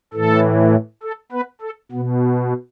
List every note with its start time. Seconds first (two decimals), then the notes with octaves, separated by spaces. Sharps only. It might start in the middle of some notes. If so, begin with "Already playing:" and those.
0.13 A2 E3 A4
1.03 A4
1.32 B3 B4
1.61 A4
1.92 B2 B3